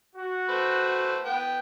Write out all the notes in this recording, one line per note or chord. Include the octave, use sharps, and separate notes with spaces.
F#4
A3 B4 C5
B3 G5